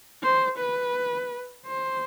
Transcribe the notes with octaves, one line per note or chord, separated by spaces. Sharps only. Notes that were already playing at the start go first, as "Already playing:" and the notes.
C5
B4
C5